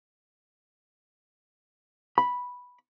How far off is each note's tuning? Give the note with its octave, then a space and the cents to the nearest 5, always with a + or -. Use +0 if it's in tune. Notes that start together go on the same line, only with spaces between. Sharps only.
B5 -5